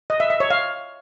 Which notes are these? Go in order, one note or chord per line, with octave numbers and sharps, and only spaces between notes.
D#5
E5
E5
C#5
F5